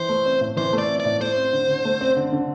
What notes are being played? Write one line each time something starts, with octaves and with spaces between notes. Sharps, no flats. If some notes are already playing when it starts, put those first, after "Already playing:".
Already playing: E3 C5
A3
C4
A2
E3 C5
A3
D5
C4
A2 D5
A3 C5
C4
D3
D3
A3
C4
D3
D3